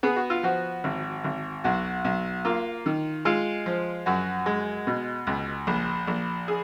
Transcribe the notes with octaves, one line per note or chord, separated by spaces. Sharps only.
B3 G#4
F#4
F4
F3 F#4
G#1
G#1
B1 F#4
B1
A#3 F4
D#3
G#3 F4
F3
F#2 F#4
G#3
B2
C#2
A#1
A#1
G#4